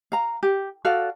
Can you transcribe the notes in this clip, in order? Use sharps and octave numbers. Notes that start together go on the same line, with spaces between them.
F5 A#5
G4
F#4 A4 D5 F5